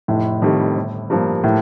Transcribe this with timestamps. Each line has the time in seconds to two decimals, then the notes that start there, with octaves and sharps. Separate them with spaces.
0.08 F1 A2
0.42 F2 D#3 G3
0.76 G1
1.10 G2 F3 A#3
1.44 A2